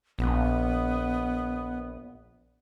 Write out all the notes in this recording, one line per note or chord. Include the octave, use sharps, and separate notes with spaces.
A#1 B3